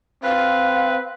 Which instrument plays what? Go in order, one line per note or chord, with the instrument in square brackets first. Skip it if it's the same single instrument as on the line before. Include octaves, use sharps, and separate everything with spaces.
[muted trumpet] C4 [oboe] B4 [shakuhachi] F5